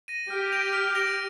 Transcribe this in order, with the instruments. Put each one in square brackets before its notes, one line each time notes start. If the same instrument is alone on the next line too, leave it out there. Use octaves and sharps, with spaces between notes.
[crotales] A#6 D#7
[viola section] G4 [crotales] F6
[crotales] A#6 D7 F7
F6
A#6 D7 F7